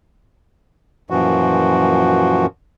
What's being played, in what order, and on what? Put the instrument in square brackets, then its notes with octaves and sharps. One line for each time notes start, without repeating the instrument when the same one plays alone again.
[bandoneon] F#2 A#2 E3 F3 F#4